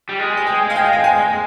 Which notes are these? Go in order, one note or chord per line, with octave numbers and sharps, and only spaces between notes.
G3
G#3
G#5
G5
F5
G5
G5
G#5